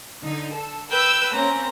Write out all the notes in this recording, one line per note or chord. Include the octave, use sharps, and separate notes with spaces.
D3 D#4
A4
B4 G5 E6
A#3 C4 C#4 A#5